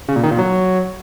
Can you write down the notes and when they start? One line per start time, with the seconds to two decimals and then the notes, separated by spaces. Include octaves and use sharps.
0.08 C#3
0.16 A#2
0.23 D#3
0.31 A#2
0.38 F#3